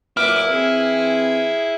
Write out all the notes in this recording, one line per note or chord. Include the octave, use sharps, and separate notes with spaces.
F#2 A#2 E4 B4 D6 F6
E3 C4 G#4